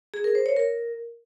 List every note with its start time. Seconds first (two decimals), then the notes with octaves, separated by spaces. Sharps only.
0.14 G#4
0.24 A#4
0.35 C5
0.46 C#5
0.56 A#4